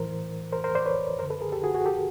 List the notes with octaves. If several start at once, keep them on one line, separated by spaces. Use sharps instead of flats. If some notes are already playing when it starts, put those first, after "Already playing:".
Already playing: A2 E3 A#4 C5
A#4 C5
A#4 C5
C5 D5
B4 C#5
F#2 D3 A#4 C5
A4 B4
G#4 A#4
G4 A4
F#4 G#4
F#4 G#4
G4 A4